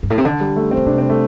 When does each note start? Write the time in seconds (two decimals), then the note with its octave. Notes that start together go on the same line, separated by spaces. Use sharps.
0.03 G2
0.10 A2
0.18 C3
0.25 D3
0.41 G3
0.56 A3
0.71 C4
0.77 D3
0.86 C3 D4
0.98 C4
1.10 A3